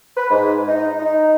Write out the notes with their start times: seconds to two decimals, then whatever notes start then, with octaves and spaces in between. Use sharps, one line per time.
0.17 B4
0.31 G#2
0.68 D#4
0.99 D#4